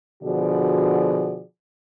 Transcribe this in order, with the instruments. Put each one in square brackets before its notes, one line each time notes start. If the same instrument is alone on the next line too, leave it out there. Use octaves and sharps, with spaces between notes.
[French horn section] B2 D3 F3 F#4 G#4 D5